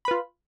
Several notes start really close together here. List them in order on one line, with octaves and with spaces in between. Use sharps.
B5 B4 F4